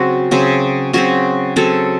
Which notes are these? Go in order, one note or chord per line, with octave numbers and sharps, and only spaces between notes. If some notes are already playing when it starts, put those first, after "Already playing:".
Already playing: C#3 F#3 C4 F#4
C#3 F#3 C4
C#3 F#3 C4 F#4
C#3 F#3 C4 A4